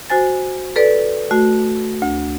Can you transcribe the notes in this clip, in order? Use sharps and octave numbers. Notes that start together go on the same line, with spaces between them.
F#4 C5 G#5 A6
A4 B4 D5
A3 F#4
D2